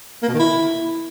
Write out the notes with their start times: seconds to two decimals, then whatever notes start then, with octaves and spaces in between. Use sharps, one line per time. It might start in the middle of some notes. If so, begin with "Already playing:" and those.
0.23 A#3
0.28 B2
0.34 D#3
0.40 E4